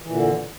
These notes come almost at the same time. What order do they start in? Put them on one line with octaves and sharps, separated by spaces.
E3 A#2 D3